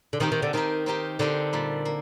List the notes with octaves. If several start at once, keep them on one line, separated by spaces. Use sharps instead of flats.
D3
D#3 C4 D#4 G4 A#4
D#3
D3
D#3 C4 D#4 G4 A#4
C4 D#4 G4 A#4
D3 C4 D#4 G4 A#4
A#2 G3 A#3
A#3